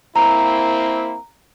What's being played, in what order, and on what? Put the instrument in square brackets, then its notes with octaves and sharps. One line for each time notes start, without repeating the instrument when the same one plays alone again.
[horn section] A#3 C4 E4 [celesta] A#5